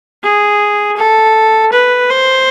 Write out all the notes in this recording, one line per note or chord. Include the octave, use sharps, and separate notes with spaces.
G#4
A4
B4
C5